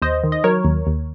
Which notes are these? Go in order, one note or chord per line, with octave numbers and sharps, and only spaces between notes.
D#2 C5 D#5
D#3
D#5
F#3 A#4 C#5
D#2
D#2